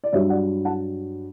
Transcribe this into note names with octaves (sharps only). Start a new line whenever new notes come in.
D5
G2 F#3 C#5 E5
D5 F#5
F#5 A5